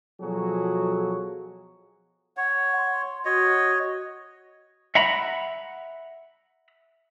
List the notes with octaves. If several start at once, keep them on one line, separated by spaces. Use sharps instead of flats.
B2 F3 F#3 F#4 G#4 A4
C#5 F#5
C6
F#4 C#5 D#5
E5 F#5 A#5 B5